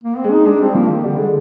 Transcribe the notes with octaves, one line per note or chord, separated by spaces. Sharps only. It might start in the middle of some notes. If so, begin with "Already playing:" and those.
A#3
C4
G#3
D#4
G#3 D4
G3 C4
F3 A#3
D#3
D3 G3
D3 G#3